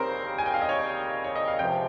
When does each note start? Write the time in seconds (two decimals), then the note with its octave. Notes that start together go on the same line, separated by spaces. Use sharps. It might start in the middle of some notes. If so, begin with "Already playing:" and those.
Already playing: D#2 C#3 G3 C4 A#4 C5
0.38 G#5
0.46 G5
0.54 F5
0.62 D#5
0.69 C#5
1.24 C#5
1.35 D#5
1.48 F5
1.59 C#2 C3 F3 G5